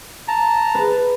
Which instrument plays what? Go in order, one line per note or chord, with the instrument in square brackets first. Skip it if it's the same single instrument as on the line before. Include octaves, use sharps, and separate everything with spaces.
[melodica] A5 A#5
[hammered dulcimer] B4